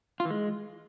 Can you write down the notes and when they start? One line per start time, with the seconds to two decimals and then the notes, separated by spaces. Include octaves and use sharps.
0.20 F4
0.25 E3
0.30 G#3